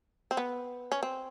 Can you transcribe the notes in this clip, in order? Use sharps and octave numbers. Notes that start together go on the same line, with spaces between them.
C4
B3
C#4
C4